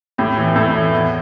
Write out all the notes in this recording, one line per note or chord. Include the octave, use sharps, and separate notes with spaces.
A2 G4
E3 A3
A2 A4
E3 A3
E2